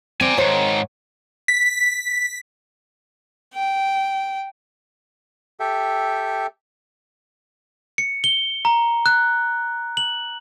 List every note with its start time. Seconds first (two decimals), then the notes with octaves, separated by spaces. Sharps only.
0.21 C4 D5 G#5
0.37 G#2 D#3 C5 C#5
1.48 B6
3.52 G5
5.60 G4 A4 E5 G5
7.98 C#7
8.24 G7
8.65 A#5
9.06 F#6
9.97 F#7